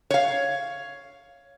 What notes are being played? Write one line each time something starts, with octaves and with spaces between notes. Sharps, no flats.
C#5 F5